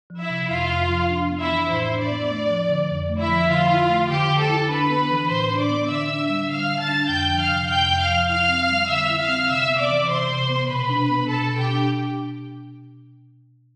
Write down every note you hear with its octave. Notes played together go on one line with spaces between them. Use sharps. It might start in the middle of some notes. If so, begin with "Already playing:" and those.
F3
E4 E5
C3
F2 F4 F5
F2
F3
D4
B3
E4 E5
E3
A2 C5
D4
D5
B3
A3
F3
D3
F2
A3
E4 E5
F3
D3 F4 F5
E4
A3
D3 G4 G5
D3
A4 A5
E4
D4 B4 B5
B3
E3
A2 C5 C6
D4
D5 D6
B3
D3 E5 E6
D4
G3
D3 F5 F6
D3
A5 A6
D4
F2 G5 G6
F3
F5 F6
C3
F2 G5 G6
F2
F5 F6
F3
E4 F5 F6
C4
G3
D3 E5 E6
E4
F5 F6
C4
C3 E5 E6
B3
D5 D6
E3
C3 C5 C6
C3
B3
B2 B4 B5
D4
B3
B2 A4 A5
B2
G4 G5
D4